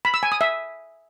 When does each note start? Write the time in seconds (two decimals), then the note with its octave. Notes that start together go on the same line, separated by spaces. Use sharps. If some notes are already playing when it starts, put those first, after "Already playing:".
0.05 B5
0.14 E6
0.23 G#5
0.32 D#6
0.41 E5